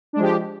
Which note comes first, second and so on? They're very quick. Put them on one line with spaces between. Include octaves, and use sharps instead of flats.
D4 G#3 F3 G4